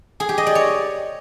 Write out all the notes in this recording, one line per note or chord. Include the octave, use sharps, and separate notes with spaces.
G#4
G4
D#5
D5
C#5